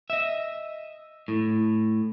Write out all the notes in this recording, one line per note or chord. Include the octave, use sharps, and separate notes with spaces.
D#5 E5
A2